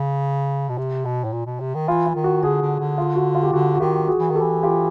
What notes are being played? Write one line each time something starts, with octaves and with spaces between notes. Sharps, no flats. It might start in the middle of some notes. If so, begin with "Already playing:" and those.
Already playing: C#3
B2
C3
B2
A2
A#2
B2
C3
D#3
E3 F4
F4
D#3
F#4
D3 F#4 G#4
D3
D3
F4
F#4
F4
G4
D3 F#4
F#4
D#3 F4 G4
F#4 G#4
E3
D#3
G4 A4
E3
F4 G4